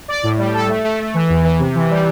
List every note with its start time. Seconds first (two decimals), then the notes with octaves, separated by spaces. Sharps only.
0.08 D5
0.23 A2
0.38 G3
0.54 A4
0.68 A3
0.84 A3
0.99 A3
1.14 E3
1.29 E2
1.44 E3
1.59 C3
1.75 E3
1.90 G3